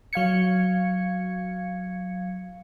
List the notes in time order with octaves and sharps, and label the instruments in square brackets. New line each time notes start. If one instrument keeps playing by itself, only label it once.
[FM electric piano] F#3 F5 G#6 C#7